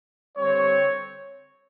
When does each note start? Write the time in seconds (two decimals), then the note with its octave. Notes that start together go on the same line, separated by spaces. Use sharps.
0.38 D3 G3 C4 C#5